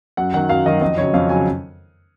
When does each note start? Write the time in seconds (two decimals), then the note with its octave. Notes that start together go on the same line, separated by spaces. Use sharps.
0.17 F#2 F#5
0.34 D#3 F#3 F#5
0.49 F#2 F5
0.66 D#3 F#3 D#5
0.81 F2 D#5
0.98 C#3 F#3 C#5
1.14 F2 F5
1.29 C#3 F#3 G#5